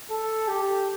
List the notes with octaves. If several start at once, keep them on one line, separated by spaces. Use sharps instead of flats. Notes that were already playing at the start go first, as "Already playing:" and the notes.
A4
G4